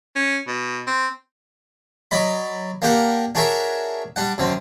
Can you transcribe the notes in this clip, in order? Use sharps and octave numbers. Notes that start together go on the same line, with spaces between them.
C#4
B2
C4
F#3 D5 D#5 B5
A#3 D4 G4 A#4 F#5
D4 F#4 G#4 A#4 C#5 E5
G3 D4 F#5
F#2 D3 C4